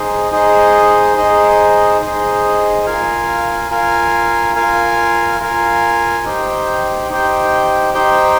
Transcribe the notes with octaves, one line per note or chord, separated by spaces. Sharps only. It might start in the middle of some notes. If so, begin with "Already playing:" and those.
Already playing: D#4 G#4 C5 D#5
D#4 G#4 C5 D#5
D#4 G#4 C5 D#5
D#4 G#4 C5 D#5
F4 A#4 F5 G#5
F4 A#4 F5 G#5
F4 A#4 F5 G#5
F4 A#4 F5 G#5
D#4 G4 C5 G5
D#4 G4 C5 G5
D#4 G4 C5 G5